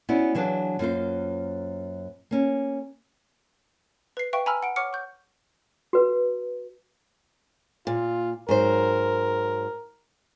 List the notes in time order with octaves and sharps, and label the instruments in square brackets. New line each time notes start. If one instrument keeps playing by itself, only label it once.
[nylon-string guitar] B3 C#4 E4 F#4 D5
E3 F#3 D4 G#4 F5
F#2 A#3 F4 C5
A#3 C#4
[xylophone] B4 C7
B4 E5 F5 G5 C#6 B6
G#5 A#5 B5 E6 F6
F#5 D7
C#5 F#5 C#6 D6 F6 C#7
C#6 G6
[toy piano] F#4 B4
[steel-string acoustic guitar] A#2 [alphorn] F4
[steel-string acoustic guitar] G#2 F#3 C5 [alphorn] A#4